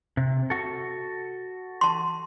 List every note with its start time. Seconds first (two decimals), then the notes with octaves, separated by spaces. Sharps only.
0.17 C3
0.50 F#4 A4
1.81 A5 C6